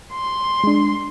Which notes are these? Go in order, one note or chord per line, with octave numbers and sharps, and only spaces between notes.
C6
G#3 D4